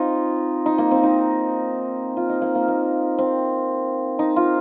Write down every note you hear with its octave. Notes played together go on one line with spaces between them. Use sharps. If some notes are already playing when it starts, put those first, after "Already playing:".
Already playing: C4 D#4 F4
D#4
A#3
C4
D#4
F4
D#4
A#3
A#3
A#3
C4
D#4
F4